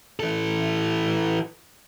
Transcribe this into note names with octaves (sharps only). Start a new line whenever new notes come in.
E3 A4